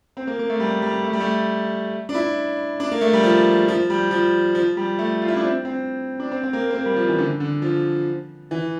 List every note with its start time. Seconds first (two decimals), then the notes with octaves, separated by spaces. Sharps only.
0.17 C4
0.27 A#3
0.39 A#3
0.50 A3
0.60 G3
0.82 G3
1.04 A3
1.13 G3
1.20 A3
2.09 D4
2.14 E4
2.80 D4
2.91 A#3
3.01 A3
3.13 G3
3.23 F3
3.68 F3
3.90 G3
4.11 F3
4.55 F3
4.77 G3
4.99 A3
5.22 F4
5.28 E4
5.37 D4
5.44 C4
5.65 C4
6.20 D4
6.32 C4
6.43 C4
6.53 A#3
6.70 C4
6.74 A#3
6.86 G3
6.96 F3
7.08 E3
7.18 D3
7.40 D3
7.62 F3
8.51 E3